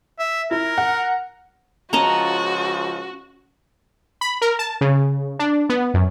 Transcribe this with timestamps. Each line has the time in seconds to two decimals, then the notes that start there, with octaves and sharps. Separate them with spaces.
0.19 E5
0.51 E4 A#4
0.78 F#5
1.93 C#2 F3 C#4 F#4 D#5 A5 A#5
4.21 B5
4.42 A#4
4.59 A5
4.81 C#3
5.39 D4
5.69 B3
5.94 F#2